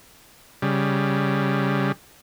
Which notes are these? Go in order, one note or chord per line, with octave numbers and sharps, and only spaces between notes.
C#3 G3